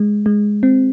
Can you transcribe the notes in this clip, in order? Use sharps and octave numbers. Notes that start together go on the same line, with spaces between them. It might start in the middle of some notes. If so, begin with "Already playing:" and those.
Already playing: G#3
G#3
C4